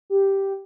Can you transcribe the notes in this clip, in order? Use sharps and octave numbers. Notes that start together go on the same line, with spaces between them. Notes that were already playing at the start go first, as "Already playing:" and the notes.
G4